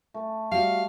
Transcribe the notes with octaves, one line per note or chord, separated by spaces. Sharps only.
A3
G3 F#4 F5